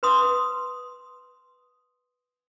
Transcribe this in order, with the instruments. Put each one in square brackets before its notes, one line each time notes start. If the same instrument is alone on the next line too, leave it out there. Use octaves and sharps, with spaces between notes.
[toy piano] B4 C6 D#6